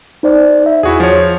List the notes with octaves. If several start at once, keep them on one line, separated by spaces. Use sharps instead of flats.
D#4 C5 D5
E5
E2 E4 F#4 G#4
F3 C#5